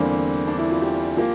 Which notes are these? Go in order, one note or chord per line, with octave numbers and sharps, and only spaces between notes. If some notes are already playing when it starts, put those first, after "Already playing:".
Already playing: E2 D3 G3 A#3 C4
D4
E4
F4
G4
F3 A#3